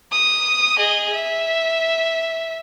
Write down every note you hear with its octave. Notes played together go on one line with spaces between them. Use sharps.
D#6
G#4 D#5
E5